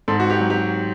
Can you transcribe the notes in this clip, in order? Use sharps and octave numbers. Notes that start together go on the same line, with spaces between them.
G#2 A4
F#4
G4
F#3
G4